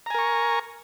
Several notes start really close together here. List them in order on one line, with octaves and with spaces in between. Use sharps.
A#5 G#5 A#4 C#6